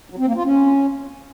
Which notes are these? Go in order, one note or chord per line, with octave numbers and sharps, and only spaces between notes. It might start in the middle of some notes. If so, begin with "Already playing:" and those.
F#3
C4
A#3
F4
C#4